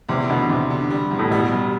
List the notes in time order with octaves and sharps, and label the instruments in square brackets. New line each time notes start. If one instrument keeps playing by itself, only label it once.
[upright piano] E2 [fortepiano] C3
[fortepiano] B2 [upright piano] D3
[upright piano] E2 [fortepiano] C3
[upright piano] D3
G3
E2
[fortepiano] A2
[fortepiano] B2 [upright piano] G3
[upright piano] E1